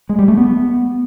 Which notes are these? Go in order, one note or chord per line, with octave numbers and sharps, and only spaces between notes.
G#3
G3
A3
B3